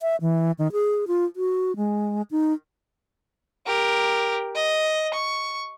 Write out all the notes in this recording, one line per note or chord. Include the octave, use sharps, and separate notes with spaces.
E5
E3
D#3
G#4
F4
F#4
G#3
D#4
G4 A#4
D#5
C#6